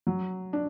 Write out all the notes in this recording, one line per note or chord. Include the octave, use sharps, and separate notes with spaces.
F#3
D4